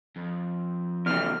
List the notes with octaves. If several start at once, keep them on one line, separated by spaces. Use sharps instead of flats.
F2
E2 C#3 F6